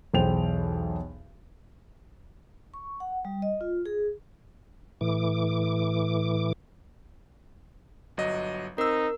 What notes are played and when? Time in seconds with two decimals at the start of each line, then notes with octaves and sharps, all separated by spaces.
0.14 B1 E2 C5 G5 F7
2.74 C#6
3.00 F#5
3.25 G3
3.42 D#5
3.61 F4
3.86 G#4
5.01 A2 E3 D6
8.17 G1 F#3 D#5
8.78 C4 D#4 A#4 E6